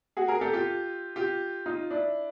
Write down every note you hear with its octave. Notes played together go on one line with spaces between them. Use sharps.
F#4 G#4
G#4 A#4
G4 A4
F4 G4
F4 G4
D#4 F4
D4 E4